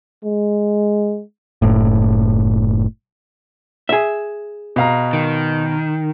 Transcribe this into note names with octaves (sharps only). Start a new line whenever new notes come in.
G#3
F#1 A2
G#4 E5
B2 F5 A#5
D#3